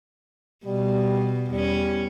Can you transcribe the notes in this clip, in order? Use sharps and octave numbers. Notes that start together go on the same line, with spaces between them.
B2 G3
E2 G3 C#4